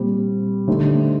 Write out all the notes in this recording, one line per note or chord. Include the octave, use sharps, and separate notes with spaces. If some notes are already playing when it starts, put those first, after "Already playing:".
Already playing: A#2 G3 C4
D3 A3 D#4 G4 C5